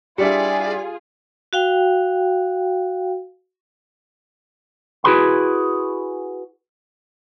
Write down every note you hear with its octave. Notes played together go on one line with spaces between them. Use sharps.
G3 D4 E4 F4 G4 G#4 D5 C#7
F#4 F5 G5
E4 F#4 G#4 B4 B5 C6